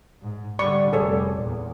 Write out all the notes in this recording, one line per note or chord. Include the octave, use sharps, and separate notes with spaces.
G#2
D3 G3 D5 B5 C#6
F1 G3 G#4 A4 C#5
E2 A#2